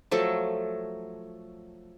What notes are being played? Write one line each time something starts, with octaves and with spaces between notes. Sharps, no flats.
F3 F#3 A3 A4